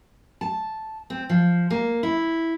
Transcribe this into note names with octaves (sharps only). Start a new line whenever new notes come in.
A5
C4
F3
A#3
E4